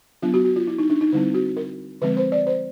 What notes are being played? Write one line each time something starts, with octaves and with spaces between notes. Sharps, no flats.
F#3 B3 D4 F4
F#4
F#4
F4
E4
D#4
D4
D#4
D3 G3 C4 E4
F#4
A#4
D3 F3 G#3 C4 B4
C5
D5
C5